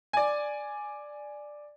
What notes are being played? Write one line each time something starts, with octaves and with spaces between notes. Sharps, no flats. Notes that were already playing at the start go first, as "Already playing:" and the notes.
D5 G#5